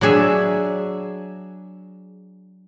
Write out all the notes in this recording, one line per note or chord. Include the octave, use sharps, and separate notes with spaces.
F#3 D4 G#4 E5